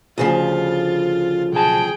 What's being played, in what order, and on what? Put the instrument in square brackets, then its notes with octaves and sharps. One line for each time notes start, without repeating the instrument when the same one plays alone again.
[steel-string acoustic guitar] D2 C#3 F3 [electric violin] F4 A6
[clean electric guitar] B1 A5 [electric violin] G#4 G5